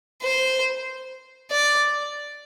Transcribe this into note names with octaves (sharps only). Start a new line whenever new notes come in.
C5
D5